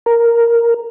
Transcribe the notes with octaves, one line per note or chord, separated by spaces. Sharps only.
A#4